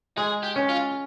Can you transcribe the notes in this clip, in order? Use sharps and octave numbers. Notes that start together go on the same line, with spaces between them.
G#3 G#4
G4
C#4
F4